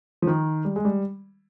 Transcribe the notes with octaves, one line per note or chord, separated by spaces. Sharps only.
F3
D#3
G3
G#3
G3